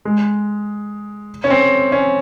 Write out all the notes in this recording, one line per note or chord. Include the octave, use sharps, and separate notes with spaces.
G#3
C#4
C4
C#4